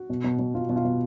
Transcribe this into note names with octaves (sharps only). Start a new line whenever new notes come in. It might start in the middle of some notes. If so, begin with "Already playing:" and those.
Already playing: F#4
B2
B2
B2
B2 F4
B2
F4
B2